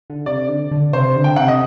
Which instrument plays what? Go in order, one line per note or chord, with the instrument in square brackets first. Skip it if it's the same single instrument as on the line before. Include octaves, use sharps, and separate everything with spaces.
[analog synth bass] D3
[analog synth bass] C3 [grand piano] D5
[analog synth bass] D3
D3
[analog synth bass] C3 [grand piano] C5
[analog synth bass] D3
[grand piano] G5
[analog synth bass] C3 [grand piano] F#5
[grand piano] D#5